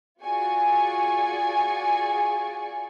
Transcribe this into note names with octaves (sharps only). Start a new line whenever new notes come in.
F4 F#4 G#4 D5 G#5 C#6